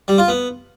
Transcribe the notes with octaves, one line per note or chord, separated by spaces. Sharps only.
G3
F4
B3